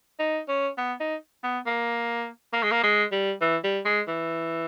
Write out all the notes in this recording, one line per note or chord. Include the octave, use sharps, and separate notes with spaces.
D#4
C#4
B3
D#4
B3
A#3
A#3
G#3
A#3
G#3
G3
E3
G3
G#3
E3